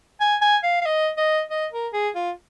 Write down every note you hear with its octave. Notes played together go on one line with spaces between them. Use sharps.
G#5
G#5
F5
F5
D#5
D#5
D#5
A#4
G#4
F4